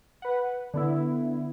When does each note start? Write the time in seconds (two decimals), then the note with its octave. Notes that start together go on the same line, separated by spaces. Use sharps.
0.22 B4 F#5
0.74 D3 B3 E4